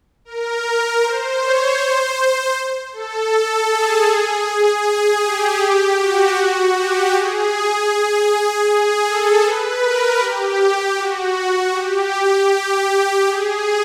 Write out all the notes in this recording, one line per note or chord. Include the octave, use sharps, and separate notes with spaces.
A#4
C5
C#5
C5
A4
A4
G#4
G#4
G4
F#4
G4
G#4
G#4
A4
B4
A#4
G4
F#4
G4
G4
G#4